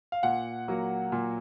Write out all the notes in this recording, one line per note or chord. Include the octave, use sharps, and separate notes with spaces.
F5
A#2 F#5
F#3 A#3
A#2